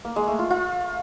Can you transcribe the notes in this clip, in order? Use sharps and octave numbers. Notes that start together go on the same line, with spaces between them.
A#3
G#3
A3
F4
F4